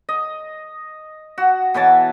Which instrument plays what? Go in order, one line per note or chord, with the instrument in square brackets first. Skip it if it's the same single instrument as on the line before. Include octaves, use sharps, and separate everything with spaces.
[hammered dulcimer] D#5
F#4
B2 E3 C#5 A5